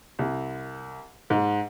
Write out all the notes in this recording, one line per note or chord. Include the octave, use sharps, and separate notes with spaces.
C2
G#2